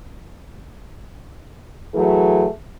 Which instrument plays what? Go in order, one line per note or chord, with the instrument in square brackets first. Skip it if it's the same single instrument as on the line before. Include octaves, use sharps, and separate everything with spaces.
[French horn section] E3 F#3 A3 G#4